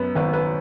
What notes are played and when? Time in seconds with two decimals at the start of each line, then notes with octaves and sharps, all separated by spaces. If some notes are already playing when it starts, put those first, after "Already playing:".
Already playing: F#2 B3 B4
0.15 G#1 B4
0.33 B4